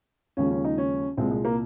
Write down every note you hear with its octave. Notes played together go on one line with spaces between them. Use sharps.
D#2 C#3 F3 G#3 C#4
C#4
D#4
C#4
C2 A#2 G#3 C4
G#3
A#3